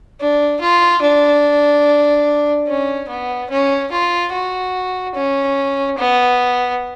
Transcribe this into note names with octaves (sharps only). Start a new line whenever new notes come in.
D4
F4
D4
C#4
B3
C#4
F4
F#4
C#4
B3